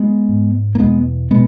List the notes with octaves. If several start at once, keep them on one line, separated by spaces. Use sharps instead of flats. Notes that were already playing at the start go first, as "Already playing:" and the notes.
Already playing: G#3 B3
G#2
A#3
E2 B2 G#3 B3
B2 G#3 B3